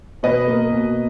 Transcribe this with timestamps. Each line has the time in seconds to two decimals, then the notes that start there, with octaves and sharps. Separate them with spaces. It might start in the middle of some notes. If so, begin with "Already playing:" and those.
0.23 B2 B4 D#5
0.47 A#3
0.72 B2